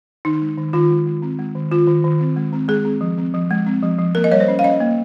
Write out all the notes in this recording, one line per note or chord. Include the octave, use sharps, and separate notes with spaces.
D#3 D#4
G#3
D#3
D#3 F4
G#3
G#3
C4
G#3
D#3
D#3 F4
D#3
D#3
C4
G#3
C4
G#3 G#4
C4
F3
C4
F3
G#3
C4
F3
F3
A#3 A#4
D#5
G3 C#5
C5
C#4
F5
C#4 D#5
A#3